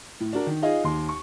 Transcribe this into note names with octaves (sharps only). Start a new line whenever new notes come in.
A2
D4 F#4 A#4
D#3
D#4 F4 G#4 D#5 F5
D#2 C6
C#6